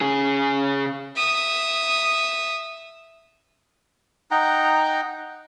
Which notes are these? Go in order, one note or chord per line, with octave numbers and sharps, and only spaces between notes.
C#3 G#4
E5 D#6
D#4 F#5 G5 A#5